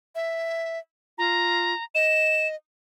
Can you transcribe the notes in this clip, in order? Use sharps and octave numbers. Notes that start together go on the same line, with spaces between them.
E5
F4 A#5
D#5 E7